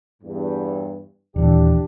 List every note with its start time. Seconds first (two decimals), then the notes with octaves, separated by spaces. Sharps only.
0.22 E2 G2
1.36 D#1 E3 D4 G4